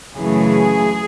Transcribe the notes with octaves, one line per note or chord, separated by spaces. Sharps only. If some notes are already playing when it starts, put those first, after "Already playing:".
F#2 C#3 E3 A3 G#4